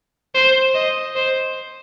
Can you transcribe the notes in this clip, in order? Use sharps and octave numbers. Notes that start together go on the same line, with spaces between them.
C5
D#5
C5